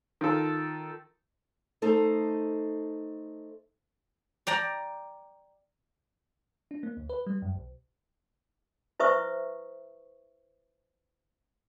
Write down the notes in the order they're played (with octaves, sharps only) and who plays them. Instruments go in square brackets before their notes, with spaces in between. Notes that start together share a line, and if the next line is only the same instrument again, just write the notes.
[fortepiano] D#3 F4 A4 A5
[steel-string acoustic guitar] A3 D#4 A4 C5
[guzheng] D5 G5 A#5
[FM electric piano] D4
A#3
D2
B4
G3
F#2
B1
[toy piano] E4 B4 C5 E5 C#6 D#6